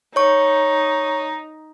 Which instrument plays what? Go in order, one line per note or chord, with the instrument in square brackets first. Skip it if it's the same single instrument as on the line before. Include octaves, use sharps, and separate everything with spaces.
[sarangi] D#4 [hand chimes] C#5 C#6